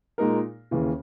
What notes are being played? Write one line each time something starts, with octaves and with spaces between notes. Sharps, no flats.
A#2 G#3 D#4 A#4
D#2 C#3 E3